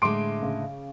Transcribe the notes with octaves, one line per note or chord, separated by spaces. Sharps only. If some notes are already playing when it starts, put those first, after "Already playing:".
A2 D3 G#3 C6 D6 D7
C#3